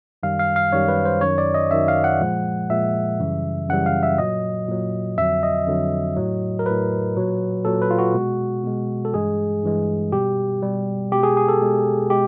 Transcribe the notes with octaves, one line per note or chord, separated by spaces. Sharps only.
F#2 D#3 G3 F5
F5
F5
F#2 D#3 G3 C#5
B4
C5
F#2 D#3 F#3 C#5
D5
D#5
F#2 D#3 F#3 E5
F5
F#5
A#2 F3 G#3
A#2 F3 G#3 E5
F#2 C#3 E3 G3
F#2 C#3 E3 G3 F#5
F5
E5
A#2 F#3 D#5
A#2 F#3
F2 D3 F#3 E5
D#5
F2 D3 F#3
A2 F#3
A#4
A2 F#3 B4
A#2 F#3
A#2 F#3 A4
B4
F4
F#4
B2 G#3
B2 G#3
A4
G2 E3 G#3 G#4
G2 E3 G#3
B2 G3 G4
B2 G3
B2 G#3 G4
G#4
G#4
A4
B2 G#3
B2 G#3 G4